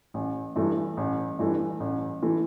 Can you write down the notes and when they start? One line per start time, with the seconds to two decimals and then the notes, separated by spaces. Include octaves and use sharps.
0.14 A1
0.56 G2 E3 A3
0.97 A1
1.39 G2 E3 A3
1.80 A1
2.23 E3 A3